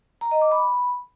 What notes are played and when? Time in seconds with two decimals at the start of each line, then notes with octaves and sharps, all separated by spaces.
0.21 A#5
0.31 D#5
0.41 D6
0.52 B5